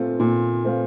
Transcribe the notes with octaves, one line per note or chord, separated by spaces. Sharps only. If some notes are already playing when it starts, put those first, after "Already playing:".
Already playing: A#2 A3 C4 F4
A#2
A3 C4 F4